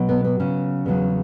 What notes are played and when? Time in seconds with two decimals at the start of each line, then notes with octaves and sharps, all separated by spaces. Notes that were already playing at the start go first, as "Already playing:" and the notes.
Already playing: B2 F#3
0.09 B3
0.24 B3
0.40 C#3 C#4
0.86 E2 C#3 F#3